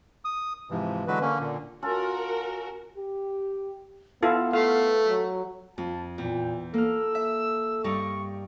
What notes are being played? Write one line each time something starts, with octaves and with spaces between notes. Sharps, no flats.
D#6
G#2 C3 E3 F3
D3 E3 F#3 G#3 F#4 B4
D3 A#3 C#4
A#2 D3
C#4 F4 F#4 A4 A#4
G4
B3 E4 F4 A4
A3 F5
F#3
F2 A5
E2 A#2 G5
A#3 A4 E6 F6
E5
G2 G3 D#4 C#6